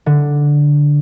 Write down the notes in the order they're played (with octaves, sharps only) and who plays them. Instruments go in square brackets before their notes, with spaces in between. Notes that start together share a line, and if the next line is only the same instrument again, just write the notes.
[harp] D3